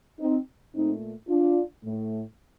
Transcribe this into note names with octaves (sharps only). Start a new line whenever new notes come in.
C4 D#4
A#2 A3 C4 D#4
D4 F4
A2 A3